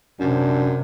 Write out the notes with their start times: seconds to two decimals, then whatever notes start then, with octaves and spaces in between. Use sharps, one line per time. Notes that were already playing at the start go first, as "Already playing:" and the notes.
0.20 F#2 C3 D4